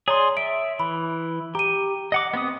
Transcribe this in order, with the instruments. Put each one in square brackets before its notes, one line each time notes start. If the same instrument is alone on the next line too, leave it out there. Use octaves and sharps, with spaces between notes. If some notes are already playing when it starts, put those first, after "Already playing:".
[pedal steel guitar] G#4 D5 C6 [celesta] C#5 A#5
[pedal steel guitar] E5 [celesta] D7
[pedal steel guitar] E3 [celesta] B5
[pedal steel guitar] G4 [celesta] A#5 D#7
[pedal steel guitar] D#5 F#5 D6
B3 C4 D#6